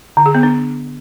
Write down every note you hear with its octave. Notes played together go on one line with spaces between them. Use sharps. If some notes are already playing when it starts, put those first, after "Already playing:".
D3
G#4
B3
D4